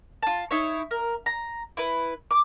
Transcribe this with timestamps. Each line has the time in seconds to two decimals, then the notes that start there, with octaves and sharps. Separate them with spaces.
0.23 F4 A5
0.51 D#4 E4 C#5
0.91 A#4
1.26 A#5
1.77 E4 B4
2.31 D6